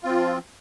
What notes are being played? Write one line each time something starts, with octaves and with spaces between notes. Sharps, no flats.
F3 C4 F4